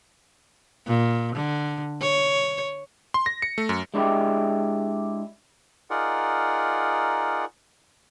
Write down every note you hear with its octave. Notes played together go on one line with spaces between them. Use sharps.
A#2
D3
C#5
C6
A#6
C#7
A3
F#2
G#3 D4 E4 G4
D#4 F4 G#4 A#4 D5 F#5